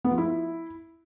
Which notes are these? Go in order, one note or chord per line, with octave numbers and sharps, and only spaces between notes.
B3
F3
E4